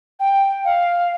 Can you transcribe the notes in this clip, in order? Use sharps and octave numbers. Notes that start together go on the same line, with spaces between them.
G5
F5